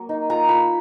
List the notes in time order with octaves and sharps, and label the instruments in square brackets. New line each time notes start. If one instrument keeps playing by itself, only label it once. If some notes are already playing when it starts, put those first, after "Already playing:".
Already playing: [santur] F#3 A#3
D#4
F4 A#5
F4 B5